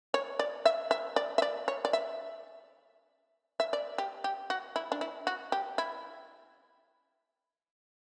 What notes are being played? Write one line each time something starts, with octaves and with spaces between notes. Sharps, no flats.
C#5
D5
E5
E5
D5
E5
D5
C#5
D5
E5
E5
D5
G4
G4
F#4
E4
D4
E4
F#4
G4
E4